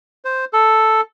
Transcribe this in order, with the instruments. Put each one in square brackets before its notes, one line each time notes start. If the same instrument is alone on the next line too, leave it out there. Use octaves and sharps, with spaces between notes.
[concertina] C5
A4